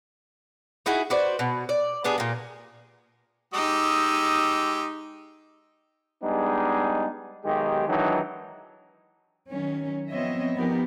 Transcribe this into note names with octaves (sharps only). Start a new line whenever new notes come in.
D#4 E4 F#4 G#4
F#4 B4 C5 D5
B2
D5
B3 D4 G4 G#4
A#2 A#3
G#3 D#4 G4 E6
G3 G#3 B3 D4 D#4 G#4
B1 D#3 G#3 D#4 G4
D#3 E3 F#3 G#3 D4 D#4
D#3 F#3 C#4
F3 B3 C4 C#5 D#5 E5
F3 B3 D#4 F#4 G4 A#4